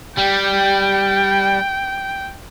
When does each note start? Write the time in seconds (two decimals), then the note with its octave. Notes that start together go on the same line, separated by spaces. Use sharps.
0.17 G3 G5